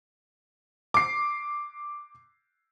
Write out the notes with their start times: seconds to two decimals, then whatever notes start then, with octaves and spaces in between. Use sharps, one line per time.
0.94 D6 C7